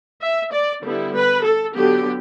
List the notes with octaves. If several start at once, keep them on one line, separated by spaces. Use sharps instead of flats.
E5
D5
D3 G3 B3 E4
B4
A4
D3 F#3 B3 G4